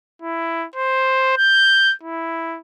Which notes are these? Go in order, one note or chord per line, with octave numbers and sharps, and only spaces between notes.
E4
C5
G6
E4